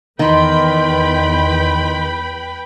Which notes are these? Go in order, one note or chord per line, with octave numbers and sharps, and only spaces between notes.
E2 D#3 B4 D#5 G5 B5 C6